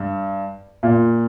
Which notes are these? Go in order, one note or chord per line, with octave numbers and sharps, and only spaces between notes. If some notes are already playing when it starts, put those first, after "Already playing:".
Already playing: G2
A#2